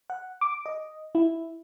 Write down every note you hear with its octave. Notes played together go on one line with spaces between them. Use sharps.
F#5
D6
D#5
E4